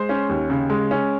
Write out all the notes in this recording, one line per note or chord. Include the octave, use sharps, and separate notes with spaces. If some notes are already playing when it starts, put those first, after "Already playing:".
Already playing: G#3 C5
C#4
D#2
C#3
G#3
C#4